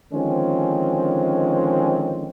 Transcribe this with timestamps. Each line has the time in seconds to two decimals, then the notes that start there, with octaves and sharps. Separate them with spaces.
0.13 D3 D#3 F3 G#3 C4 C#4